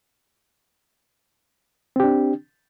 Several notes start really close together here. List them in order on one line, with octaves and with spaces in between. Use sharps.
C4 G4 D4